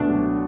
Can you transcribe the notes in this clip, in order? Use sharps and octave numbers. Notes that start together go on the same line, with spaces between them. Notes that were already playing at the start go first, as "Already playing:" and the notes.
Already playing: C#2 B2 A3 D4
F#3